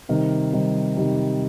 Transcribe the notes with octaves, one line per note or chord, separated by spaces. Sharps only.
C3 D#3 G3
C3 D#3 G3
C3 D#3 G3